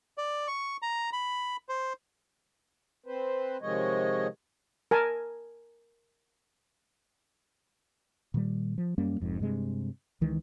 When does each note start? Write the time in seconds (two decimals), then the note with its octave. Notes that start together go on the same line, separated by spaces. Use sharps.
0.18 D5
0.48 C#6
0.82 A#5
1.13 B5
1.69 C5
3.06 C4 B4 C5
3.62 C3 D#3 F3 G#3 C#5 D#5
4.91 A#4 G#5 A5
8.34 A#2 D#3 G3
8.78 F3
8.98 F#2 G3 A#3 C#4
9.20 F1 F2 G#2
9.40 G2 C3 G#3
10.21 C#2 D#3 E3 G#3